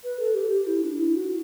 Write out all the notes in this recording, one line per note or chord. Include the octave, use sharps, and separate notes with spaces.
B4
A4
G4
G4
E4
D4
E4
F#4